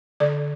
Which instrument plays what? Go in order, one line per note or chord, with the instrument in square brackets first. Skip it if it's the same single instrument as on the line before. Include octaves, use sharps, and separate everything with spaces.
[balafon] D3 D5